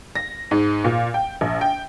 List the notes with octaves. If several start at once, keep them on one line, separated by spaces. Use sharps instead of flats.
A#6
G#2
A#2
G5
A#1
G5